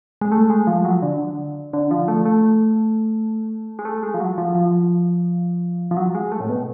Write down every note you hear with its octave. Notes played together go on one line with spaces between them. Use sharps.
G#3
A3
G#3
F3
F#3
D3
D3
F3
A3
A3
G#3
A3
G#3
F3
F#3
F3
F3
F3
F#3
G#3
A3
A2
B2